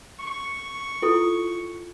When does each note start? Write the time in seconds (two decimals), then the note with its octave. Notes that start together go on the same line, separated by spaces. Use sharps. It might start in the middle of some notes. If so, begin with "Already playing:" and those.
0.20 C#6
1.02 E4 F4 A4